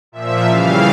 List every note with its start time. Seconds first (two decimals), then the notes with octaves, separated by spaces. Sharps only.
0.12 A#2 F3 E5
0.45 C#3 E3 G3 F5